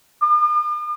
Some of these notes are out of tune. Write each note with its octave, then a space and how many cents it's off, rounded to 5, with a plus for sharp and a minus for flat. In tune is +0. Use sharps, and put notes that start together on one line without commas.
D#6 -45